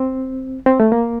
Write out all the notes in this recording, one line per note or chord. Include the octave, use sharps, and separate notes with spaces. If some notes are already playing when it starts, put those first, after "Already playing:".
Already playing: C4
C4
A3
A#3